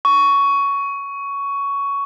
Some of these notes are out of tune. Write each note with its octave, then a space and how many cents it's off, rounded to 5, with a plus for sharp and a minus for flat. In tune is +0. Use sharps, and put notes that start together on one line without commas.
C#6 +10